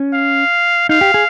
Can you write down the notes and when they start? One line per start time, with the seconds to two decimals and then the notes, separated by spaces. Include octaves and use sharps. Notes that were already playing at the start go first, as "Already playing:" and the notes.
Already playing: C#4
0.14 F5
0.89 D#4 F5
1.01 G4
1.14 G#4